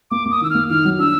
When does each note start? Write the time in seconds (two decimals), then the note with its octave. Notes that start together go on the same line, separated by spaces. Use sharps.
0.11 A#3 D6
0.26 A#3
0.31 D#6
0.41 D#3 E6
0.50 A#3 F6
0.69 D#3 F6
0.85 F#3
0.99 D4 E6